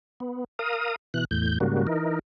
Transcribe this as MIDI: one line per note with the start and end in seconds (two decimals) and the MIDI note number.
0.20 0.44 59
0.59 0.96 70
0.59 0.96 77
0.59 0.96 87
1.14 1.25 47
1.14 1.25 52
1.14 1.25 90
1.31 1.58 40
1.31 1.58 45
1.31 1.58 91
1.60 1.87 44
1.60 1.87 49
1.60 1.87 55
1.60 1.87 58
1.60 1.87 66
1.87 2.19 52
1.87 2.19 63
1.87 2.19 70